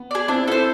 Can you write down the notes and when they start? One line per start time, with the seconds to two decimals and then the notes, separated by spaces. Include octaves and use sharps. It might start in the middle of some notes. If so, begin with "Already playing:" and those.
Already playing: B3
0.11 G#4 D5
0.28 C4 D4 E4
0.48 C4 E4 A4 C5